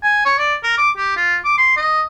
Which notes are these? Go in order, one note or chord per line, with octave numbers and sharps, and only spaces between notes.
G#5
C#5
D5
A#4
D6
G4
F4
D6
C6
D#5